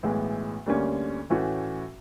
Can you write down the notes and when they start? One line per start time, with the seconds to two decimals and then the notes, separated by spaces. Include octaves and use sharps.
0.03 B1 A2 E3 G#3 B3
0.66 D2 D3 G3 A#3 C#4
1.30 A2 E3 A3 C#4 F#4